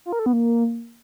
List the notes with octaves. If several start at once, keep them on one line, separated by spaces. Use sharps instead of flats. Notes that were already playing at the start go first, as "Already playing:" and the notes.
F4
A#4
A4
B3
A#3